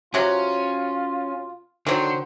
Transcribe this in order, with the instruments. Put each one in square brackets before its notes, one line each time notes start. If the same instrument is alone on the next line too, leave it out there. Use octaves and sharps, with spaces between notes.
[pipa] C3 F#3 [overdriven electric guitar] C#4 [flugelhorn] F4
[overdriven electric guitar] D3 [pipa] D#3 F#3 [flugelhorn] C5